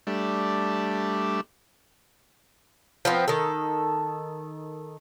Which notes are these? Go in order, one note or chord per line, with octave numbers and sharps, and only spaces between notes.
G3 A3 D4
F3 B3 C4
D#3 A4